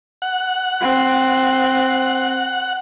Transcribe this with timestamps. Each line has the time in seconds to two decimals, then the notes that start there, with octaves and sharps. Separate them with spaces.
0.22 F#5
0.82 C4